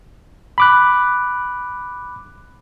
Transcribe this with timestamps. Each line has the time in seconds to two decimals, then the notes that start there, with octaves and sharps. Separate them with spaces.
0.58 B5 D6 F#6